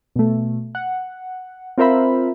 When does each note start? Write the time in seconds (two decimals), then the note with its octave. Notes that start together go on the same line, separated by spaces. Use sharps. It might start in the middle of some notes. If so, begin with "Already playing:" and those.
0.16 B2 A3
0.75 F#5
1.78 C4 F4 A#4 C5 E5 B5